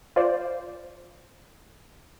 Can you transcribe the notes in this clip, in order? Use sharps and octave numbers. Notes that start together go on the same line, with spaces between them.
F4 C5 D5